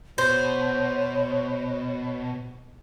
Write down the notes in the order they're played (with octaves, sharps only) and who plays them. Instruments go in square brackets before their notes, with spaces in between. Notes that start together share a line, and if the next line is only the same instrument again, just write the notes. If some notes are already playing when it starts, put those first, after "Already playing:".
[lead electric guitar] B2 [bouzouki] C5 [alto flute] C#5